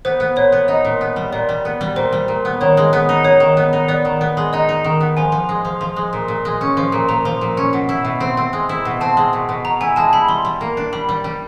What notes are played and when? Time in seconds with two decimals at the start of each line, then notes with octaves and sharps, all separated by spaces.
0.05 B3 C5
0.20 B3
0.36 A#2 C#5
0.52 B3
0.68 D#4 D#5
0.85 A#2
1.01 B3
1.16 G3
1.32 A#2 D5
1.49 G3
1.65 B3
1.81 G3
1.96 A#2 C5
2.12 G3
2.28 A#2
2.45 B3
2.61 D#3 C#5
2.77 G#3
2.93 B3
3.09 D#4
3.25 D#4 C#5
3.40 D#3
3.57 B3
3.73 D#4
3.88 B3 D5
4.05 D#3
4.21 B3
4.37 G#3
4.53 D#4 D#5
4.69 D#4
4.84 D#3
5.00 B3
5.17 F3 G#5
5.32 F3
5.49 G#3
5.65 F3
5.81 F3
5.96 G#3
6.13 A#2
6.28 A#2
6.45 G#3
6.61 C#4
6.77 F3
6.92 A#2
7.09 A#2 A#5
7.25 F3
7.41 A#2
7.57 C#4
7.73 B2
7.89 E4
8.05 B2
8.20 C4
8.37 C4
8.53 G#3
8.69 E4
8.85 B2
9.01 C4 A5
9.17 G#3
9.33 B2
9.49 B2
9.65 B2 A#5
9.81 E4 G#5
9.96 G#3 A5
10.13 E4 B5
10.28 G3 C6
10.45 G3
10.61 A#3
10.77 D4
10.93 G3 B5
11.09 G3
11.24 G3